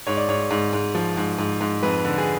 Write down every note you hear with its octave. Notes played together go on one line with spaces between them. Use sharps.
G#2 C#5
D5
G#2 C#5
G#2
G#2
F3
G#2
G#2
G#2
F2 B4
D3
G#4